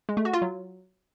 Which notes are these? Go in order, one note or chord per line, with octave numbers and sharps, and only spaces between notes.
G#3
A3
F#4
F4
F#3